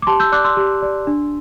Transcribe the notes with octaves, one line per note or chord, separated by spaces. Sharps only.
D6
G4 A5 C6
E6 G6
D5 D6 F#6
C6 E6
G4
D5
D4